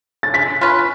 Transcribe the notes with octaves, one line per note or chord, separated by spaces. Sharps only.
A6
G#3 B6
C#4 F4 B4